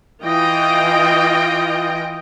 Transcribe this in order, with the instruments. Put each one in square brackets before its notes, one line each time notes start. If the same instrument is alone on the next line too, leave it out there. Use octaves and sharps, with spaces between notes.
[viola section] E3 F4 D#5 G5